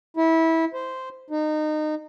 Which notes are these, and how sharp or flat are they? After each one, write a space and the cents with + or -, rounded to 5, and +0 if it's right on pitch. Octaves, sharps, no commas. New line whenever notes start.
E4 -20
C5 -10
D#4 -25